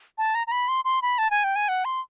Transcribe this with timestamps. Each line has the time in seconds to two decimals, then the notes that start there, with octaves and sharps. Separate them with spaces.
0.18 A5
0.35 A#5
0.47 A#5
0.52 B5
0.68 C6
0.85 C6
1.02 B5
1.18 A5
1.31 G#5
1.44 G5
1.56 G#5
1.69 F#5
1.85 C6